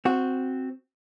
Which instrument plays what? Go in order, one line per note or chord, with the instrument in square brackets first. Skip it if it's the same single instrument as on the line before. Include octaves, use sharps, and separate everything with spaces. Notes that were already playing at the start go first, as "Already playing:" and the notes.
[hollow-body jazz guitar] C4 F#4